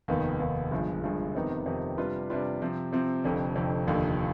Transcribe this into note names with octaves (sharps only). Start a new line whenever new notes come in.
F1 D#2 D#3 B3
F1 D#2 D#3 B3
G1 G2 F3 G#3
G1 G2 F3 G#3
F2 C3 D#3 B3 D#4
F2 C3 D#3 B3 D#4
C3 G3 D4 F4 B4
C3 G3 D4 F4 B4
C3 F3 C4
C3 F3 C4
F1 F2 D3
F1 F2 D3
F1 D#2 D3 F3